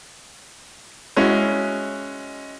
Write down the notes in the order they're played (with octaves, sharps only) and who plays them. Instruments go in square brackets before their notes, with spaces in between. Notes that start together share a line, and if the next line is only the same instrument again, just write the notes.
[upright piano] G#3 C#4 E4 F#4